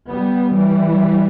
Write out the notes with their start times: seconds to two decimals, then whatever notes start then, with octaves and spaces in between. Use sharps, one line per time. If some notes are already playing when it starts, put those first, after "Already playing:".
0.08 G3 B3
0.54 E3 G3